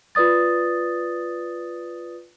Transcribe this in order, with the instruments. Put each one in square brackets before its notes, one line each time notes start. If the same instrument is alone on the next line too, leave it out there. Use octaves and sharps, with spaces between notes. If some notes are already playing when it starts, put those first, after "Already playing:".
[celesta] F4 B4 D5 D#6 A6